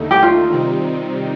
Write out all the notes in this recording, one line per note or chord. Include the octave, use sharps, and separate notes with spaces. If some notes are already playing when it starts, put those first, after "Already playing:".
Already playing: D#2 D3 A3 D#4
G4
F4
C3 D#3 G3 C4 D#4